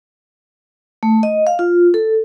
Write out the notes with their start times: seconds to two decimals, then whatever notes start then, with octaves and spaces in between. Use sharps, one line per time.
1.03 A3
1.23 D#5
1.47 F5
1.59 F4
1.94 A4